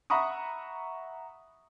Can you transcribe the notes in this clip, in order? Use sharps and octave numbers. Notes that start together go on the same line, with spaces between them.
E5 F#5 A#5 B5 C#6 D#6